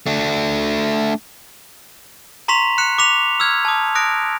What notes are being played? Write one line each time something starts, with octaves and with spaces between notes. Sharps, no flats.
A3 D4
A#5 C6 C#6 B6 F7
F#6 C#7 E7
D6 B6 F7
E6 F6 G#6
A5 D#6
D#6 F#6 A#6 D7